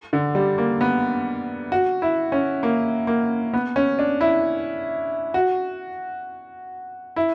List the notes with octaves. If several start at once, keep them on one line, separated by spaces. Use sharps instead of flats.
D3
G3
A#3
B3
F#4
E4
C#4
A#3
A#3
B3
C#4
D4
E4
F#4
E4